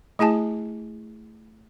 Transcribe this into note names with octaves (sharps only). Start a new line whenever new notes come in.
A3 E4 G#4 G#5 A5